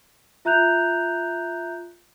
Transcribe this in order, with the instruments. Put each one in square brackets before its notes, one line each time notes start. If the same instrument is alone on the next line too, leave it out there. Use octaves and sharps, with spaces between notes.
[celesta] F4 E5 A#5 F#6 G6 F7